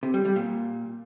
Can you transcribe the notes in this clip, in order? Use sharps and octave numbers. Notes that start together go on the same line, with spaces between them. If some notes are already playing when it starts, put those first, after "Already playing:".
C3
G3
G3
A#2